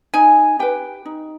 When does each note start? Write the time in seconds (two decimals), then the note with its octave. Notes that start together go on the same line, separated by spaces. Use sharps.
0.14 D#4 G#5
0.59 G4 B4 G5
1.06 D#4